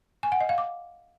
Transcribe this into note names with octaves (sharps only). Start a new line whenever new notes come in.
G#5
F#5
D#5
F5
D6